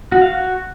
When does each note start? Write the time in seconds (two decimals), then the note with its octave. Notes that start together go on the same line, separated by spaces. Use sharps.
0.12 F#4
0.22 F5
0.31 F#4